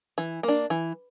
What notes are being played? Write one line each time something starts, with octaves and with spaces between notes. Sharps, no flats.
E3
A#3 D4
E3